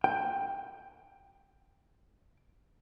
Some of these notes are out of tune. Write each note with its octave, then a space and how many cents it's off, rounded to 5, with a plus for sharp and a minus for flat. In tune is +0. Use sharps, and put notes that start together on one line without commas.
G5 +15